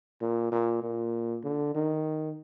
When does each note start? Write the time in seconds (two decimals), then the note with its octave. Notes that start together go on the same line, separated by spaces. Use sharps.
0.21 A#2
0.52 A#2
0.82 A#2
1.44 D3
1.75 D#3